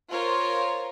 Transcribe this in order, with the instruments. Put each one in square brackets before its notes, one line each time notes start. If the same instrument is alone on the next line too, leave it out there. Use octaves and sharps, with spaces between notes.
[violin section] F4 A#4 C5 C#5